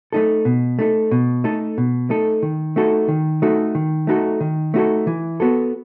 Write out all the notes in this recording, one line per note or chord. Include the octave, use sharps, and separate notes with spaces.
A3 D#4 A4
B2
A3 D#4 A4
B2
A3 D#4 A4
B2
A3 D#4 A4
D#3
A3 D#4 F#4 A4
D#3
A3 D#4 F#4 A4
D#3
A3 D#4 F#4 A4
D#3
A3 D#4 F#4 A4
E3
B3 F#4 A4